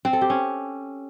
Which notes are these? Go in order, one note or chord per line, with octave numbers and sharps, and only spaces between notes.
C4
A4
G4
C#4